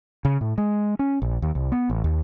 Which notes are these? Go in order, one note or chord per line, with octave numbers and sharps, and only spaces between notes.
C#3
A2
G#3
C#4
A#1
D#2
C2
B3
A1
D#2